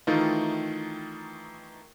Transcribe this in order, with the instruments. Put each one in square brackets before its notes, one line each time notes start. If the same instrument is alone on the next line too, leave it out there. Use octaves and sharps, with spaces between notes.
[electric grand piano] D#3 E3 A3 D#4 F4